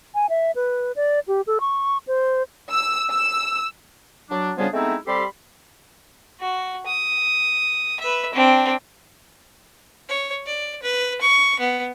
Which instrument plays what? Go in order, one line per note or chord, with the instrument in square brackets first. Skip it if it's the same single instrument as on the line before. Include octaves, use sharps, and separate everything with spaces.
[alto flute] G#5
E5
B4
D5
G4
A4
C#6
C5
[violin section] E6
E6
[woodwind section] F#3 D4
C#3 F3 G3 B3 D4 G#4
G#3 A3 B3 C4 D#4 E4
G3 C4 G4 A4 B5 C6
[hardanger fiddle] F#4
D#6
B4 E5
C4 D4
[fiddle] C#5
D5
B4
C#6
B3